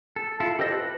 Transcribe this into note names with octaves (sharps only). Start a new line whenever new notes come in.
A4
E4 F4 A4
G4 A4 C5 D#5 E6
B4